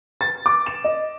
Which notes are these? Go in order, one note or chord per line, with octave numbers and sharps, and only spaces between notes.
A6
D6
E7
D#5